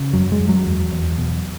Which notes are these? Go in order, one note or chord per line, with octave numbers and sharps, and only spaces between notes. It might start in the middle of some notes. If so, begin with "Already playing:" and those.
Already playing: C#3
F#2 F#3
G#3
F#2
F#3
E2
E2
B2